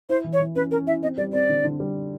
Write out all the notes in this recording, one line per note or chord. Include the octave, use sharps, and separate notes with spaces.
E4 C5
E3
C#5
E3
C#4 B4
C#4 A#4
E4 E5
C4 D#5
G3 D5
C4 D5
D3
D3
G3